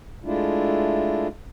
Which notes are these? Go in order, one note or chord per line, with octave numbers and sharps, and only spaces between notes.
G#3 A3 D4 E4 F4